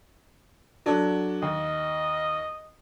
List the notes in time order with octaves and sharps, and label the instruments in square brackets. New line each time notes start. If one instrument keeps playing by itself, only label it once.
[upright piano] F#3 D4 A4
[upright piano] D#2 [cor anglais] D#5